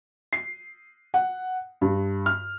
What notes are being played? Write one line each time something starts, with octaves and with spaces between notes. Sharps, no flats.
C7
F#5
G2
F6